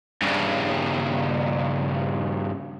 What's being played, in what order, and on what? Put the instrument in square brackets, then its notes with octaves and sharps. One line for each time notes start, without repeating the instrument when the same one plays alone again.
[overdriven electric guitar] G2 C#3